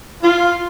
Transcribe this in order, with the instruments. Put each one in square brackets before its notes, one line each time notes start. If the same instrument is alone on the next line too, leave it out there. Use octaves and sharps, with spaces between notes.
[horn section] F4